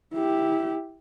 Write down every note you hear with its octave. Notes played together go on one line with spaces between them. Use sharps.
E4 G4